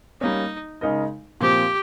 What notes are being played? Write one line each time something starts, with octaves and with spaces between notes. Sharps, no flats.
G3 A#3 C#4 D#4
C#3 G#3 D#4 A#4 D#5
A#2 F3 C4 G4